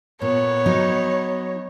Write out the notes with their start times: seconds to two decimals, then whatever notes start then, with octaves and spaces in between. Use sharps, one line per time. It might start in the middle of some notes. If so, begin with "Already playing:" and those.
0.22 A#2 B3 C#5
0.66 F#3 D#4